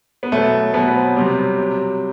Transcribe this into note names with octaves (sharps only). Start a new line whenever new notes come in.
B3
B2 F#3 A3
B2 F#3 B3
C4
C3 F#3 G3
C3 F#3